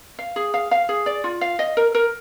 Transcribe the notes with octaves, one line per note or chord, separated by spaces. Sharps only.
F5
G#4
F5
F5
G#4
D5
F4
F5
D#5
A#4
A#4